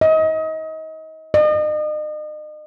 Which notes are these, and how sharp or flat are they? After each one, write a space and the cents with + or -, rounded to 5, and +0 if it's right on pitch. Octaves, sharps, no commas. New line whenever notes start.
D#5 +30
D#5 -40